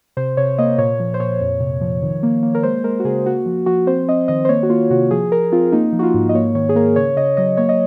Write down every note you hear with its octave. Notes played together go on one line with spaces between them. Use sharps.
C3 C5
C3 C#5
A#3 D#5
A#2 C#5
F3
C5
A#2 C#5
F2
C3
F3
D#3
A#3
A#3
A#4
G#3 C5
G#3 A#4
F#4
C#3 G#4
A#3 F#4
F3
F3 F#4
C4 C5
C4 D#5
D#3 D#5
C5
A#3 C#5
F#4
A#3 F4
C3 F#4
F3 G#4
F3 A#4
C4 F4
A#3 D#4
F3
F#4
F4
G#2
D#5
A#3 C#5
D#3 C#5
G#4
A#3 A#4
C#3 C#5
C#3 D#5
F#3 D#5
A#3 C#5
D#5